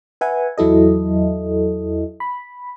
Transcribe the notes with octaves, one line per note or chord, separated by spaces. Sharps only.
B4 E5 F#5 G#5
E2 F#3 E4 A4 D#5
B5